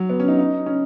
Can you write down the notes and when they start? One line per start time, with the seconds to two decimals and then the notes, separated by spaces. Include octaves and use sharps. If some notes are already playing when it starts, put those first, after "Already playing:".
Already playing: F#3
0.09 B3
0.20 C#4
0.28 D#4
0.38 D#4
0.66 C#4